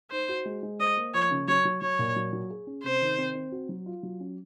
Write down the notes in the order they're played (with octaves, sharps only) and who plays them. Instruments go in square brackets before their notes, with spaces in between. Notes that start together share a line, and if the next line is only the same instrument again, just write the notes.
[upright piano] D#4 [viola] C5
[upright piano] F#4
G#3
G#3
[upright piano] C5 [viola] D#5
[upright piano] A#3
[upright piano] F3 [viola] C#5
[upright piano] C#3
[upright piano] F#3 [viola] C#5
[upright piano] F#3
[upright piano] F#3 [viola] C#5
[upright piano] A#2
F#3
F#3
G#4
C#4
[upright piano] C3 [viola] C5
[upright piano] D#3
C4
C4
F#4
F#3
F4
F#3
C#4